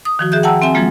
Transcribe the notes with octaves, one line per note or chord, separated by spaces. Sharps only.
D#6
D#3 F3 F#4
G#4 E5 F#6 G6
F#5 G5 A5 A#5 E6
C4 E5 G#5
F3 F#3 G#3 A#3 F4